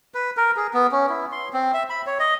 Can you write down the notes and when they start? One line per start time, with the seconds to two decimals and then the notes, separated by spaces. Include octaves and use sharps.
0.14 B4
0.37 A#4
0.56 G#4
0.74 B3
0.92 C#4
1.09 E4
1.32 C6
1.53 C4
1.74 E5
1.90 B5
2.07 C#5
2.20 D#5